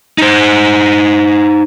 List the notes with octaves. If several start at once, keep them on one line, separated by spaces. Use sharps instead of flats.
D#4 C5